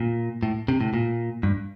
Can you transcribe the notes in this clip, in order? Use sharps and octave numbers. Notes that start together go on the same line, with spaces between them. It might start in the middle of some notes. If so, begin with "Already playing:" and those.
Already playing: A#2
A2
C3
A2
A#2
G2